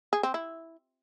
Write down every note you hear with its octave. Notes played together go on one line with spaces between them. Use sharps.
G#4
C4
E4